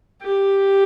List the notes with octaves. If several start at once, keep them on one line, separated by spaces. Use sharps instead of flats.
G4